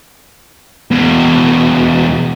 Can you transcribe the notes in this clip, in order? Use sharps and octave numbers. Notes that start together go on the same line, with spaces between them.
E2 B2